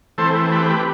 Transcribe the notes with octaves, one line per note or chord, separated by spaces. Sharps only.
E3 A3 C4 A4 C5
G4 B4